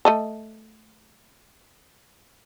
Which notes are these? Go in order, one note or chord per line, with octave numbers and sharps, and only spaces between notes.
A3 D#5 A5